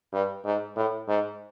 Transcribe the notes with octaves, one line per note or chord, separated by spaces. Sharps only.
G2
G#2
A2
G#2